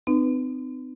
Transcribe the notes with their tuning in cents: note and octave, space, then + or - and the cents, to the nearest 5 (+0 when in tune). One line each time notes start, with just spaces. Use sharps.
C4 -40 D#4 -30 B4 +0